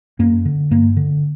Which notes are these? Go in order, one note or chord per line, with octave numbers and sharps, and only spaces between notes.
F#2 A#3
D3
G2 A#3
D3